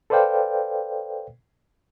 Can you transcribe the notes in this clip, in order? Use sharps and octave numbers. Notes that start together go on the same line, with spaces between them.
A4 B4 C5 D5 F5 G5